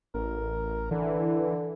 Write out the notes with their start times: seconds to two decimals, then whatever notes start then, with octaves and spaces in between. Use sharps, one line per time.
0.14 A1 A#4
0.91 D3 E3